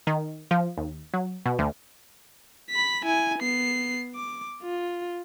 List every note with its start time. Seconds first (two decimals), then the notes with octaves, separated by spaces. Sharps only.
0.07 D#3
0.51 F3
0.78 D#2
1.14 F#3
1.46 B2
1.59 D2
2.70 B5 B6
3.05 E4 G#5
3.39 B3 C7
4.15 D6
4.63 F4